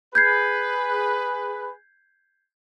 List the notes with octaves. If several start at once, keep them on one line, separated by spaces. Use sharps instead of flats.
G#4 B4 G6 G#6 C7